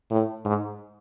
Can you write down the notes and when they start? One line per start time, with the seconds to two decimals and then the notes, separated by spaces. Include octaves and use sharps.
0.11 A2
0.45 G#2